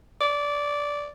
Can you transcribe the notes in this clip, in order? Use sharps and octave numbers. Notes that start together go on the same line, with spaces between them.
D5